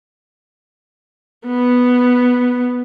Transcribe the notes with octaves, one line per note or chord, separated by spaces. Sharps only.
B3